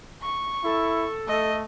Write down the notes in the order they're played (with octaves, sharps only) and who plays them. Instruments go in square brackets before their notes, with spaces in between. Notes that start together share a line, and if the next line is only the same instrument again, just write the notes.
[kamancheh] C#6
[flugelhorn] E4 [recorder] A4
[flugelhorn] A3 [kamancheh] D#5